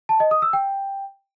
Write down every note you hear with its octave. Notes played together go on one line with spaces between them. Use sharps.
A5
D#5
D#6
E6
G5